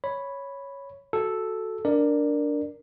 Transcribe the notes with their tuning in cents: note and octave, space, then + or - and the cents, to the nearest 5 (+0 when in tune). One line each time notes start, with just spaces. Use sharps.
C#5 +0 B5 +0
F#4 +0 A4 -5
D4 -10 A#4 +0 D5 +10